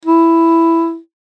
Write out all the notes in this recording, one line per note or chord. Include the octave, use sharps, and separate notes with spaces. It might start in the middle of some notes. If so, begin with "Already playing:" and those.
E4